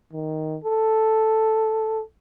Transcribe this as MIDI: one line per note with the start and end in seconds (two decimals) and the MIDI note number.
0.13 0.57 51
0.64 2.02 69